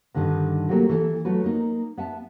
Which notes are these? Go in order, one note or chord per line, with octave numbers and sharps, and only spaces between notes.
G2 D3 D#3 D#4
F#3 G3 A3 A#3 G4
E3 A4
F#3 A3 B3 F#4 B4
A#3 D#4
B3 E5 A5